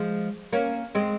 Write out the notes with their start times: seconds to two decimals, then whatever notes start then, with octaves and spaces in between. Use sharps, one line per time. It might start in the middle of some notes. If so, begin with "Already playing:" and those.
Already playing: F3 G#3
0.53 A#3 C#4
0.95 G#3 C4